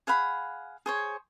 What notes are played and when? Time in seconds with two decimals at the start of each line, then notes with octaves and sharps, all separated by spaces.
0.07 G#4 F5 F#5 B5
0.86 G#4 C5 C#5